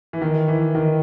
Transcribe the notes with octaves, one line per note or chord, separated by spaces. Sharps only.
E3
D#3
E3
D#3